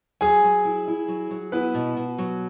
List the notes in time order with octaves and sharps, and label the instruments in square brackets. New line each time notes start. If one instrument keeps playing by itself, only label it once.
[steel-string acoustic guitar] F#3 [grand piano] G#4 G#5
[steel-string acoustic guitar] F#3
E4
E4
F#3
F#3
[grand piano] B3 B4 [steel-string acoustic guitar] E4
[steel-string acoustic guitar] B2
B2
F#3